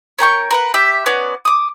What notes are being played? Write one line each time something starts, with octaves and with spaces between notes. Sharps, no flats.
C#4 A#4 G5 C#6
A#4 B4 F#5
G4 E5
B3 C#4 F#4 D5
D6 D#6